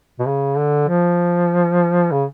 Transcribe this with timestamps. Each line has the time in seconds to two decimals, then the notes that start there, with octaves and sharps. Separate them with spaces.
0.19 B2
0.27 C#3
0.57 D3
0.88 F3
2.12 C#3